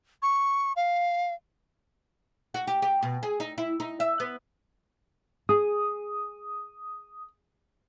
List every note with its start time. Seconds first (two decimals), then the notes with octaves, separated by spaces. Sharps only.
0.23 C#6
0.76 F5
2.54 F#4
2.67 G4
2.82 G4
3.03 B2
3.23 G#4
3.40 D#4
3.58 E4
3.80 D#4
4.00 E5
4.20 B3
5.49 G#4 D#6